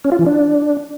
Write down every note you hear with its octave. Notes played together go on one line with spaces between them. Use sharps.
C#4
F4
E3
D4